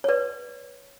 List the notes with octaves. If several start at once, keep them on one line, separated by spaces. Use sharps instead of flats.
C#5
B4 D5